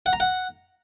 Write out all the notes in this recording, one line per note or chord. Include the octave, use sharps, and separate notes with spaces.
F#5
A#5
F#5